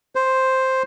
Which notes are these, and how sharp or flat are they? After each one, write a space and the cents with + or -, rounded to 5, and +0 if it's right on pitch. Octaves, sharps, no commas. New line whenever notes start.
C5 +5